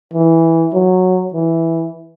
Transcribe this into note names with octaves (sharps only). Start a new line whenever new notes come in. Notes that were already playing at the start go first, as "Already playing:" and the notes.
E3
F#3
E3